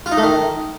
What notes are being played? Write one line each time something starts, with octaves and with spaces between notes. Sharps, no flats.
F4
D#4
A3
D#3